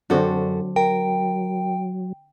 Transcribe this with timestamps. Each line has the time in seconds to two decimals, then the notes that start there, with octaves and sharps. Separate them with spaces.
0.10 F#2 D3 F#3 C4 D4 F#4 A4
0.76 A#4 G5